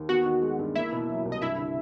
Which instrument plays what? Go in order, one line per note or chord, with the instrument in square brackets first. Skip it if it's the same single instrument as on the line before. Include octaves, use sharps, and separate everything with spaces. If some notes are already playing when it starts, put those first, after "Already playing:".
Already playing: [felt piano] D#2
[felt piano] B3 [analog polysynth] F#4 F#5
[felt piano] D#3
G#3
G2
[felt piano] A#3 [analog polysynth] E4 E5
[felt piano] B2
F#3
C2
[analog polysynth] D#5
[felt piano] G2 [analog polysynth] E4 E5
[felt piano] D3